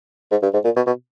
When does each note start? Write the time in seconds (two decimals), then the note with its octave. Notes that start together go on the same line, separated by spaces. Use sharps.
0.31 G#2
0.43 G2
0.53 G#2
0.65 A#2
0.76 B2
0.87 B2